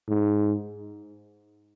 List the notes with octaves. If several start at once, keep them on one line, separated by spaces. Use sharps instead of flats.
G#2